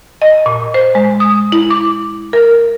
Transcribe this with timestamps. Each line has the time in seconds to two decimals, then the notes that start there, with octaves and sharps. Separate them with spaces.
0.22 D#5
0.46 A#2
0.74 C5
0.95 G#3
1.20 D#6
1.52 E4
1.70 D6
2.33 A#4